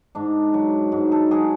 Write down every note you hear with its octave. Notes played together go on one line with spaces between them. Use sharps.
G#2 D4
F#3
G#2
A4
F#3 G#4